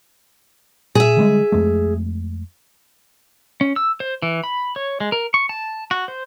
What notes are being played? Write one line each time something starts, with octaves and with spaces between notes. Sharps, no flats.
A#2 G#4 E5
D3 G3 G#3
F2 G#3 A3
C#4
E6
C5
E3
B5
C#5
G#3
A#4
C#6
A5
F#4
C5